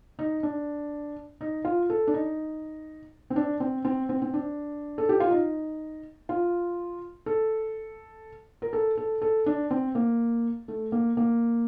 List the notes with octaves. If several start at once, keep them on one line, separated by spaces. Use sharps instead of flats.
D#4
D4
D#4
F4
A4
D4
D#4
C4
D4
C4
C4
C4
C4
D4
A4
G4
F4
D#4
F4
A4
A#4
A4
A4
A4
D4
C4
A#3
A3
A#3
A#3